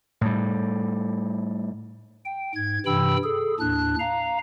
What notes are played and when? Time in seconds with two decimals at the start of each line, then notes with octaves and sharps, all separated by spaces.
0.21 A2 G3
2.25 G5
2.55 G#2 G#6
2.86 G2 C3 E3 G5 B5 E6
3.24 G#4 A4
3.60 D#2 A2 D4 F#6
4.00 F5 A#5